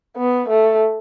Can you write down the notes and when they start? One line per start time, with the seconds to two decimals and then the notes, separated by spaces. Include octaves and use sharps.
0.17 B3
0.49 A3